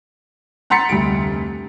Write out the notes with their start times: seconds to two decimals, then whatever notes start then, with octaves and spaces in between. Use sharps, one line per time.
0.70 F#5 A#5 C6 A6 B6 C#7
0.89 F1 D2 G3 D7